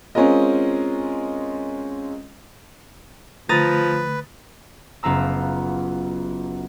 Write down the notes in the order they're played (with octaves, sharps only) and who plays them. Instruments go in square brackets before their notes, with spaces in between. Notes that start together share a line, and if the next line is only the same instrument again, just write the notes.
[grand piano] G#3 C4 C#4 F4 A#4 D#5
[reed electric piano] D3 A3 [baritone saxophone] F3 [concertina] B4 [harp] A#5 D#6 A6
[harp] F#1 B3 F4 A#5 E6